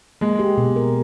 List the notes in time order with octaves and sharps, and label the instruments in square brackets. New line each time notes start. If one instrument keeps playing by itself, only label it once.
[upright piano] G#3 [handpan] A#3
[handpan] G4
B2
A#4